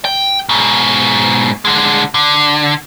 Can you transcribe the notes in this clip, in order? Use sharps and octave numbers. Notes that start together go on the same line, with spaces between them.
G5
G#2 B2
D3 G#3
D3